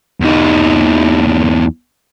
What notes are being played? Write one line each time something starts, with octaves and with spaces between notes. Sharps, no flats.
E2 D#4